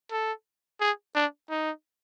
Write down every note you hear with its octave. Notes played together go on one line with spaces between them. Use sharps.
A4
G#4
D4
D#4